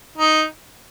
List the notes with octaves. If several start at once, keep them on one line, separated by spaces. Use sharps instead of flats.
D#4